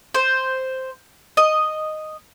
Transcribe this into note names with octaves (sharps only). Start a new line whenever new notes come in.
C5
D#5